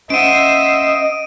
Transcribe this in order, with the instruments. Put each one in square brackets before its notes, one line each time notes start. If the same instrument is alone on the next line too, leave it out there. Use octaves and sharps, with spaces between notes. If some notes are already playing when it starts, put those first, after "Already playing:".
[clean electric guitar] C#4 F#5 [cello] C5 E5 [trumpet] D#5 [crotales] D7 D#7